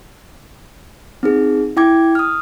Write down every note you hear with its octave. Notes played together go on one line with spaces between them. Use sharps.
C4 D#4 G#4
E4 G5 D6 G#6
D#6 F6